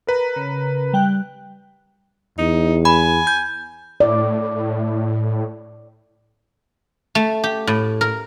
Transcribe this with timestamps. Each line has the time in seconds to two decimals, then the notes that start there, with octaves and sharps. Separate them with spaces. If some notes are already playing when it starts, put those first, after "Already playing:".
0.07 A#4 B4 A#5
0.36 C#3
0.93 G3 G5 F#6
2.38 E2 D#4
2.85 G#5 B5
3.27 G6
4.00 A2 D5
7.15 A3
7.44 G4
7.67 A2
8.01 A#4